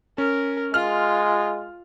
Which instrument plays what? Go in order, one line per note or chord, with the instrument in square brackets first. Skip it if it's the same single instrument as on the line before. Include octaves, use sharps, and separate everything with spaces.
[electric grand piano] C#4 [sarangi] A#4
[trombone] G#3 [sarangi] F4 [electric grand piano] F6